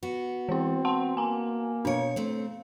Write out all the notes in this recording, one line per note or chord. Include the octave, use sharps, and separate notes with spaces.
B3 F#4
E3 C4 E4
F#5 A5 C6
A#3 G#5 A#5
B2 D4 C#5 F5
A3 C4